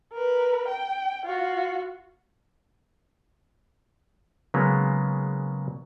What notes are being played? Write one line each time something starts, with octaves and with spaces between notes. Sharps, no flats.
A#4 B4
G5
F4 F#4
C#3 F#3 G#3 A#3 B3